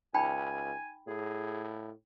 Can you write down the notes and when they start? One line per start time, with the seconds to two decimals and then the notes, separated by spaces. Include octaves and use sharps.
0.14 C#2 D#4 G5 G#5 B5
1.07 A2 G#4